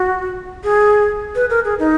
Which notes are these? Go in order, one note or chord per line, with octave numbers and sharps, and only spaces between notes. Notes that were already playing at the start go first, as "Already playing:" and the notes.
Already playing: F#4
G#4
B4
A#4
G#4
D#4